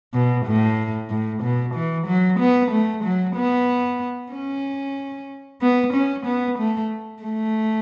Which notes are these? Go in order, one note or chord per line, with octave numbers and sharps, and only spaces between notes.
B2
A2
A2
B2
E3
F#3
B3
A3
F#3
B3
C#4
B3
C#4
B3
A3
A3